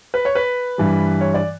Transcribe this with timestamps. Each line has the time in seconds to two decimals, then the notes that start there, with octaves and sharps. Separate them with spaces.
0.14 B4
0.25 C#5
0.35 B4
0.78 G2 E3 G3
1.21 C#5
1.34 D5